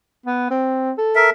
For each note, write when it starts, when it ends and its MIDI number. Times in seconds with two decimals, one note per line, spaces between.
0.26 0.48 59
0.51 0.92 60
0.98 1.29 69
1.15 1.30 70
1.15 1.30 76